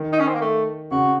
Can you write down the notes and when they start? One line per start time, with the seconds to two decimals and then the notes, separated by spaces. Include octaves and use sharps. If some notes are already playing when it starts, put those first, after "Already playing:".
Already playing: D#3
0.12 D#4
0.19 C#4
0.27 C4
0.34 A#3
0.41 A3
0.91 C#3 F#4